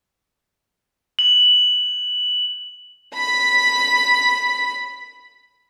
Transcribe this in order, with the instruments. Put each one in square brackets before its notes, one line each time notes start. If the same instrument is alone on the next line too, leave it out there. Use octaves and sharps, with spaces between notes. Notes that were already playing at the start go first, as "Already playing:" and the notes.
[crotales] F#7
[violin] B5 B6